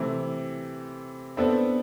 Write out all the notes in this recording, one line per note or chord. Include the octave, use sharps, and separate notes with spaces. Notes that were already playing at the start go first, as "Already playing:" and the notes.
Already playing: C3 E3 A3 C4 E4
B3 C4 D4 E4 A4 E5